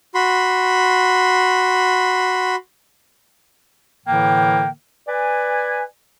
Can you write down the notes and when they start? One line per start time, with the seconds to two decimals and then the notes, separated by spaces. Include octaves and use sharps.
0.15 F#4 B5 C6
4.06 A2 D3 E3 A#3 G5
5.08 B4 D5 G#5